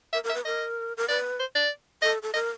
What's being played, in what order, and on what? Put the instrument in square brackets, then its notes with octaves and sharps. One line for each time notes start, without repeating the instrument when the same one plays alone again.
[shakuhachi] A#4 [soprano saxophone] E5
[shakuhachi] A#4
[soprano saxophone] E5
[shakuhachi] B4
[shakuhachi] A#4 [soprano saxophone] D#5
[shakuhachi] A#4
[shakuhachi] B4 [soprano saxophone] D5
[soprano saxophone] C5
D5
[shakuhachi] A4 [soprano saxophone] D#5
[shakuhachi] A4
[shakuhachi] A#4 [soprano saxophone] D#5